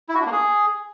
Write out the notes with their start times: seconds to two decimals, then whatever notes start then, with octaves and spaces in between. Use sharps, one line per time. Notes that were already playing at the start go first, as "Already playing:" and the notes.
0.09 E4
0.14 F#4
0.20 D4
0.26 A#3
0.32 G#4